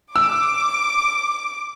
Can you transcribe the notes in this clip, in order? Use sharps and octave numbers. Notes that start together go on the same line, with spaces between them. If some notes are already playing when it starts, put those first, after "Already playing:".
D6 E6